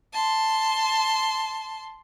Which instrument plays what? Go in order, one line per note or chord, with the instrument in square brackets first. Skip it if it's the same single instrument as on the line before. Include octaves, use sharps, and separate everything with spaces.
[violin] A5 C6